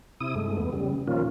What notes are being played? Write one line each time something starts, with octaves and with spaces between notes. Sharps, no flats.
C3 E4 D#6
G2 G#3 A3
E2 B3
C#3 G3
A#2 D#3 F3 A#3 C#4 F4